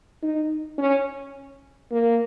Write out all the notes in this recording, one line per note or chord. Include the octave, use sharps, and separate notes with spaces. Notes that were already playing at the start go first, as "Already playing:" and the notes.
D#4
C#4
A#3